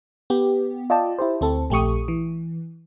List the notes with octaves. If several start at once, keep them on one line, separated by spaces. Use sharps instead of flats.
B3 G4
F4 D5 D#5 G5 A5
E4 G4 C5
D2 C4 A4
A#1 A3 G4 C#6 D#6
E3